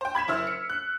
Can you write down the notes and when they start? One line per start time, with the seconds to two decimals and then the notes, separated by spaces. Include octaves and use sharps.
0.01 C5 G5
0.15 B5 G#6 B6 E7
0.28 F#1 E4 C5 E6 F6
0.47 C#7
0.70 F#6